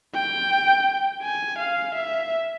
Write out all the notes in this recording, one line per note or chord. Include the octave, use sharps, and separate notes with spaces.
G5
G#5
F5
E5